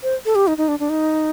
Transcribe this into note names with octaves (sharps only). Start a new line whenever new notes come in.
C5
A4
G4
D#4
D#4
D4
D4
D#4